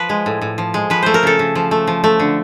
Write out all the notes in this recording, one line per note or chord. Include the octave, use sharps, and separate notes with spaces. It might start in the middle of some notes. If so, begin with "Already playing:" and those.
Already playing: F3 B4
G#3
A2
A2
F3
G#3
F3 B4
A3 C5
A#4
C#3 A4
C#3
F3
A3
F3
A3
D3